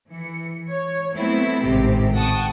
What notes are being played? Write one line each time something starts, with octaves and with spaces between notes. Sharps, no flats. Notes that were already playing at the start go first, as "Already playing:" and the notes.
E3 C#7
C#5
F#3 A3 B3 C4 E4
A1 G#2 C3 D#3 C4 G4
F#5 G5 A5 C#6 D#6